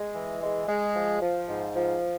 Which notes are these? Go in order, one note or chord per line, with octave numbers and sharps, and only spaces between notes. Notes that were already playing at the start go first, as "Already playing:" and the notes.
Already playing: G#3
E3
G#3
G#3
F3
F3
G#2
F3